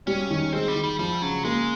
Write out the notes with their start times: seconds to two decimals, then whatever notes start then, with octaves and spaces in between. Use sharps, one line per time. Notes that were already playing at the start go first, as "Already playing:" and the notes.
0.07 G3 C#4
0.30 D#3
0.53 G#3 C4
0.68 G3
0.76 D#3
0.83 G3
0.99 F3 G3
1.22 C#3 F#3
1.45 G#3 A#3